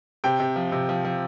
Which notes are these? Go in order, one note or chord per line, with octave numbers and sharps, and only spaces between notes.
C3 G5
C3
F3
C3
F3
F3